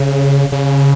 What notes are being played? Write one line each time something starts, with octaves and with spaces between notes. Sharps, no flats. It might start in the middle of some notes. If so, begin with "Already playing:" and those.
Already playing: C#3
C#3